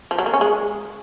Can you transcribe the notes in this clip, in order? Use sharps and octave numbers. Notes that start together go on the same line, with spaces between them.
F3
F#3
A#3
C#4
G#3